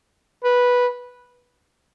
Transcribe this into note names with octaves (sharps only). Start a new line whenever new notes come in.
B4